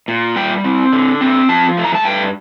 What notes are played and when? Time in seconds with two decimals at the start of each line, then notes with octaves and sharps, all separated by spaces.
0.08 A#2
0.36 G3 G5
0.64 C4
0.93 D3
1.21 C4
1.49 F3 A5
1.77 A3
1.84 A#5
1.95 A5
2.05 G2 G5